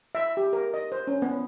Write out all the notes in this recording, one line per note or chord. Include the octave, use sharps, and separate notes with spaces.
E5
G4
A#4
D#5
C5
C#4
B3